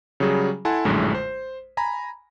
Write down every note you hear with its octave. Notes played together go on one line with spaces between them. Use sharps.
C#3 F#3 G3 G#4
E4 A4 F#5 G#5 A5 C6
A#1 F#2 A2 D3 G#3
C5
G#5 A#5 B5